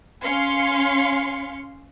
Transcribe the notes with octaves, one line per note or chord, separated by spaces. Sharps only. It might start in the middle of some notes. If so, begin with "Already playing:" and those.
C#4 F5 C6 C#7